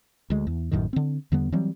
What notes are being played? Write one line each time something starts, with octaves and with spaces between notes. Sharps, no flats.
D2 G#3
E2
A1 F#2 A2 D#3
D3 C4
E2 D3 G3 B3
E3 F#3 G3 C4